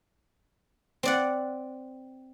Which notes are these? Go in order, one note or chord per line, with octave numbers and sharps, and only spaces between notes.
C4 D5 F#5